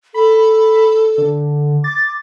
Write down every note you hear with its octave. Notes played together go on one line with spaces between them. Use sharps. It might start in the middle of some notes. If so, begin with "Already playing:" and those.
A4 B5
D3
D6 A6